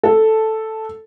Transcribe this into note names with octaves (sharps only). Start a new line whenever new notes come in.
A4